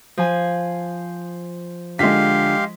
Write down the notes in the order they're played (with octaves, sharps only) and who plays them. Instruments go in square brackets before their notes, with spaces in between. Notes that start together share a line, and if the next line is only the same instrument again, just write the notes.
[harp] F3 G#5
[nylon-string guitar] D3 F4 [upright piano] G#3 B6 [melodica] G4 F5